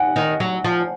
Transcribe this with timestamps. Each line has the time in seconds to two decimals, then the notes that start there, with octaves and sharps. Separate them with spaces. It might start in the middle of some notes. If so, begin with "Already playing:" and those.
Already playing: F#5 G#5
0.16 D#3
0.40 F#3
0.64 F3